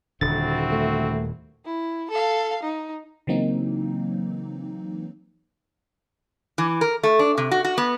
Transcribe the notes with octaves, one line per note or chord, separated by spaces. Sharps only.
D#1 D3 C4 E4 F#4 A6
A3
E4
A4 F5
D#4
C#3 E3 F#3 A#3 C4 D#4
E3
A#4
A3
D4
C3
F#4
F#4
B3